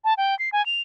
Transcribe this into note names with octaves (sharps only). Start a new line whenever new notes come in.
A5
G5
C7
G#5
F7